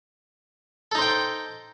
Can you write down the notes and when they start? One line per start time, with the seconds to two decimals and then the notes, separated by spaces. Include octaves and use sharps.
0.92 A4
0.95 D#4
0.98 C5
1.02 G5